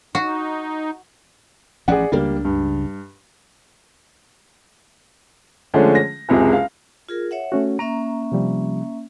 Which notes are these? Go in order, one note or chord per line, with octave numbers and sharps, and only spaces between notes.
D#4 F#4
A1 F3 C#4 G#4 D5 F#5
C#2 C#3 G3 A#3 D4
G2
D3 F3 G#3 A3 C#4
A#6
F#1 C#2 C3 G#3 G#4
F5
F4 G#4 A#4
C#5 E5 F#5
A3 C#4 F#4
A#3 C#4 E5 A#5
C3 F3 G3